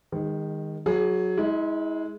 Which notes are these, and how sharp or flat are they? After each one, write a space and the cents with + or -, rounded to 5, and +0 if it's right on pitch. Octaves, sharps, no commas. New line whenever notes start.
D#3 +0 G#3 -35
F#3 -5 G#4 +20
G#3 +0 E4 -40